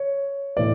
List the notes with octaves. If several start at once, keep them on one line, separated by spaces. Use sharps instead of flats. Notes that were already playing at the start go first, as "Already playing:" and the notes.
Already playing: C#5
A2 E3 D5